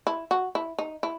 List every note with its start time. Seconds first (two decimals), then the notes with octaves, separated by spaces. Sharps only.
0.07 E4
0.31 F#4
0.55 E4
0.78 D#4
1.03 E4